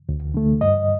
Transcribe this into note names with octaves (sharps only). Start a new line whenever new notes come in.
D2
D3 A3
G2 D#5